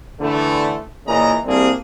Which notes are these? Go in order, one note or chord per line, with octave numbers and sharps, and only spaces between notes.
D3 E3 A3
A#2 C#3 E3 D#5 A#5
C2 G3 A#3 C4 D4 G#4